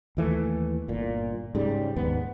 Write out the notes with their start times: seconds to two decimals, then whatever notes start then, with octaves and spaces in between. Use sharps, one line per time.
0.17 D#2 E3 A3
0.88 G1 A#2
1.55 G#2 C#3 G3
1.96 D#2 G#2 B3